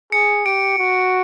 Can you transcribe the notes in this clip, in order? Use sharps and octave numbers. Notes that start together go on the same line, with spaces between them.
G#4 C#7
G4 D7
F#4